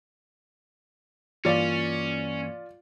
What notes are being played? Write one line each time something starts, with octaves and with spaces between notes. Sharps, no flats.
G2 E3 A#3 C#4 F4 D5 F5